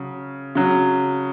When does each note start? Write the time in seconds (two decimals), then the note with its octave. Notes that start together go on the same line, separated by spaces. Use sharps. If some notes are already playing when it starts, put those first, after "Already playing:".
Already playing: C#3 F#3
0.55 C#3 F#3